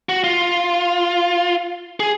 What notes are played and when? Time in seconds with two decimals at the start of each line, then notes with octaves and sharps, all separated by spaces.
0.09 F#4
0.24 F4
2.00 G#4